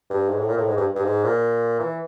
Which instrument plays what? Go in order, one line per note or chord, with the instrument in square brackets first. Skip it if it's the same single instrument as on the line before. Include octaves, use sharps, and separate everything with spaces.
[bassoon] G2
G#2
A2
A#2
A2
G#2
G2
G2
G#2
A#2
E3